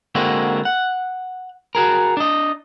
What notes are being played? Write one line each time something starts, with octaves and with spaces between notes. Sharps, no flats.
D3 G#3 A#3 C4 F#4
F#5
F#4 G#4 A#4
D4 D#5